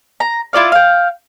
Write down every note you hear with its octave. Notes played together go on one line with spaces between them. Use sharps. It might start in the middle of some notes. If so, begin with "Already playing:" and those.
A#5
E4 F4 D5 F5
F5 G5